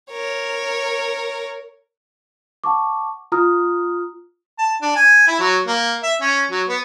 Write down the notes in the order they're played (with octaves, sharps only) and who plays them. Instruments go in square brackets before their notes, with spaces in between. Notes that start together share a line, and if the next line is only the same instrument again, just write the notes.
[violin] A#4 C#5
[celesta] F#5 A5 C#6 D6
F4 A#5 D#6 F6
[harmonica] A5
D4
G#5
E4
F#3
A#3
E5
C#4
F#3
B3